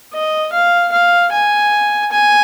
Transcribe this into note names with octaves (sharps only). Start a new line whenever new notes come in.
D#5
F5
F5
G#5
G#5